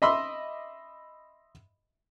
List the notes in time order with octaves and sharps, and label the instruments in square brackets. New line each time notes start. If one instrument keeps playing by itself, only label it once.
[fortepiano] D#5 E5 B5 C6 D6 E6